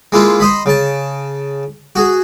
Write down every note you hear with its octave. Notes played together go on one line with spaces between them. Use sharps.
G#3 A#3 E4 F4
C5 D#5 B5
C#3 A5
F#4 G#4